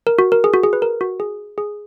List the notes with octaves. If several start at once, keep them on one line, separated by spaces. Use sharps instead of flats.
A#4
F#4
A#4
G#4
F#4
G#4
B4
A#4
F#4
G#4
G#4